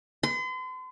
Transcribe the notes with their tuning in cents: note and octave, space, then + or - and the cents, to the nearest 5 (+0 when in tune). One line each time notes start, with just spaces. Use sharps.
C6 -40